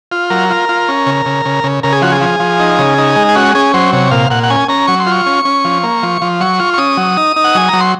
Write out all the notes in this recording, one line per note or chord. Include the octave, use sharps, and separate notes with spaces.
F4
F#3 A#4
F4
F4
C#4
C#3
C#3
C#3
C#3
C#3 A#4
G#4
F3 F#4
G#4
F3
F3
D#4
C#3
D#4
G#3
G#4
C#4 F#4
C#4 G#4
F#3 C5
C3 C#5
A#2 F5
A#2 F#5
F#5
C#4 G#5
C#4 A#5
F#3 C#6
C6
F4 C#6
C#4
C#4
F3
A#3
F3
F3
F#3 C#6
F4
C#6
C#4 D#6
F#3
D#4
D#4
F#5
F#3 G#5
F#3 A#5
C6